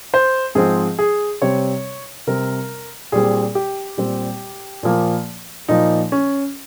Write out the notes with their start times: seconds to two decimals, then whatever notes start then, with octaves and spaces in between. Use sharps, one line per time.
0.14 C5
0.55 G#2 F3 G#3 C4 G#4
0.99 G#4
1.42 C3 G3 C4 C#5
2.27 C3 G3 C4 A#4
3.12 A#2 G3 C4 G#4
3.55 G4
3.97 A#2 G3 C4
4.83 A#2 F3 A#3
5.68 A#2 F3 A#3 D#4
6.12 C#4